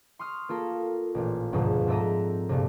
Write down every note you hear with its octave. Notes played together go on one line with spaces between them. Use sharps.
C6 C#6 D#6 F6
A#3 F4 A4 A#4
A1 A#2
G1 D2 G#2 B2 F3
G#2 C4 A4 E5 A#5 D#7
A#1 G2 C3